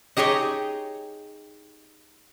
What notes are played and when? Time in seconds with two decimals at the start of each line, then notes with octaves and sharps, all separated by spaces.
0.17 D#4 G4 G#4 C#5 D#5